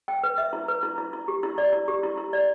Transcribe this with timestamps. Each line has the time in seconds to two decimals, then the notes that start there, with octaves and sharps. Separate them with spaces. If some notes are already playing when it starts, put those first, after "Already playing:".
0.08 G5
0.23 B4
0.38 E5
0.53 E4
0.68 B4
0.83 E4
0.98 E4
1.13 E4
1.28 G4
1.43 E4
1.58 D5
1.73 E4
1.88 G4
2.03 E4
2.18 E4
2.33 D5